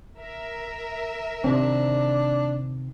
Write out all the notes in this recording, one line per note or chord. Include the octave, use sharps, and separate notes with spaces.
A#4 E5
C3 D#3 C4 D4